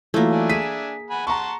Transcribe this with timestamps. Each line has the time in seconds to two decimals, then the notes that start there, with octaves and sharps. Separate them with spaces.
0.14 E3 F#3 A3 A#3 F4
0.31 D4 E5 G#5
0.49 G#4 B6
1.10 F#5 G#5 B5
1.27 F#5 A5 A#5 C6 C#6